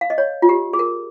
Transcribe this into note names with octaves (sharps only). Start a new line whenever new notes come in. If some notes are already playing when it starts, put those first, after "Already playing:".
F5
D#5
C#5
F4
G4
G#4
A#4